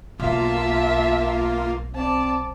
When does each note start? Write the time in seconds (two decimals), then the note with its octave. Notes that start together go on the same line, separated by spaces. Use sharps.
0.19 B1 A#3 F4 E5 A5
1.95 C4 D5 A5